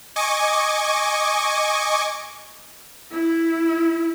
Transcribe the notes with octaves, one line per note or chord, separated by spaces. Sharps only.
D#5 G#5 C#6 D6
E4